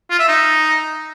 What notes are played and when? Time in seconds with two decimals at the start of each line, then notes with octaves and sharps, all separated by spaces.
0.10 F4
0.19 E5
0.28 D#4